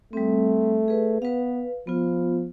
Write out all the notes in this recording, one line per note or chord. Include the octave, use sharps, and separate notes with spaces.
G3 A3 C4
G#4 B4
B3 B4 F5
F3 B3 F4